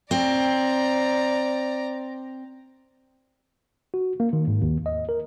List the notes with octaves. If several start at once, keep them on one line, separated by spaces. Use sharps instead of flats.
C4 D5 A#5
F#4
A#3
D#3
G#2
D#2
D#5
A#4